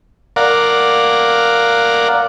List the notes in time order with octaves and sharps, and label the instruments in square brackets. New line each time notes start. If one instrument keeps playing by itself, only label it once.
[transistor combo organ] A#4 D5 F5 F#5